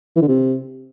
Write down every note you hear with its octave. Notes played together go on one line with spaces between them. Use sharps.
E3
D3
C3